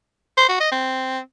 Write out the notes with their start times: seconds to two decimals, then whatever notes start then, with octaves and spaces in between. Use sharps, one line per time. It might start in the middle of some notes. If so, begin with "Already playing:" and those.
0.37 C5
0.48 F#4
0.60 D#5
0.71 C4